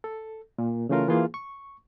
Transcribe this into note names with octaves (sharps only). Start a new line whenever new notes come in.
A4
A#2
C#3 E3 A3 C#4 F4 A#4
E3 A#3 F4 G#4
C#6